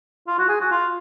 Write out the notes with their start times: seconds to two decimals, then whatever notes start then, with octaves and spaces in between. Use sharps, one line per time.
0.27 F4
0.38 F#4
0.48 G#4
0.60 F#4
0.71 F4